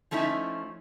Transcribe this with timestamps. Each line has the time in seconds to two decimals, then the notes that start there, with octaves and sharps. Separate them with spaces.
0.11 F3 A3 C#4 D#4 E4